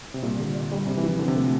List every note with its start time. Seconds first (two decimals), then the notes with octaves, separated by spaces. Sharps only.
0.14 C3
0.22 A#2 G3
0.38 D3
0.55 D4
0.71 G3
0.87 C3 C4
0.97 E3
1.03 F3
1.09 E3
1.19 D3 C4
1.28 C3
1.36 A3